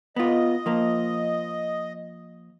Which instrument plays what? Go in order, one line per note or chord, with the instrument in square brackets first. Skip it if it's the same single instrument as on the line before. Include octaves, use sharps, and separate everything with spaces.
[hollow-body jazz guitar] B3 F4 [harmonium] D#5
[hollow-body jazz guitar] F3 A#3